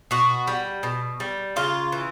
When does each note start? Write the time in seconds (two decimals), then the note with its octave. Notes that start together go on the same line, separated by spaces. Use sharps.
0.11 B2 F#4
0.47 G3
0.83 B2
1.20 G3
1.56 C#3 F4
1.92 E3